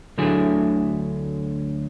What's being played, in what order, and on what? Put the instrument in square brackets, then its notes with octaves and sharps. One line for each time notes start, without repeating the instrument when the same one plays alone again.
[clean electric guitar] D2 D3 F#3 A3 E4 G#4